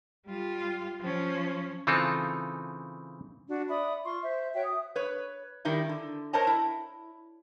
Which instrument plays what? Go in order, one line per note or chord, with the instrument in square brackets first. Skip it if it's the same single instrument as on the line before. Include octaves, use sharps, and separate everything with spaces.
[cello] G3 F4
F3 C#4
[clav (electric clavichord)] C#3 E3 C4 D#4 F4 A4
[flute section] D4 F#4
D5 E5 B5 D#6
F4 C6 C#6
C5 E5
F#4 C#5 E5 G5
D#6
[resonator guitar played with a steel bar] B4 C#5
D#3 G3 D#4 E4
D3
A#4 C5 C#5 D#5 A5 A#5
E4